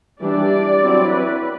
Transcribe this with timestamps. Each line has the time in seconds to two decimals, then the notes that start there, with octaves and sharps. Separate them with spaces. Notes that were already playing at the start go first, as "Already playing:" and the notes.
0.21 E3 G3 D4 D5
0.81 F#3 C4 E4
1.11 B4